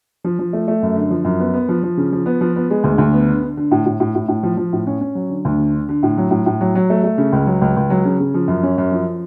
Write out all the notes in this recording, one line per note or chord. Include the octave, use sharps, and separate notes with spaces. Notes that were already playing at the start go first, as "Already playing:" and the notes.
F3
F3
A3
A3
F#2
D3
F3
F#2
B3
B3
F3
F3
C#3
F3
B3
F3
B3
G#3
D2
D2
B3
D3
D3
D3
A2
A2
A2
A2
A2
F3
F3
A2
C#4
C#4
F#3
D3
D2
D3
D3
D3
A2
F#3
A2
A2
F#3
F#3
A3
A3
C#3
C#2
F#3
C#2
C#2
F#3
C#3
C#3
F3
F#2
C#4
F#2
F3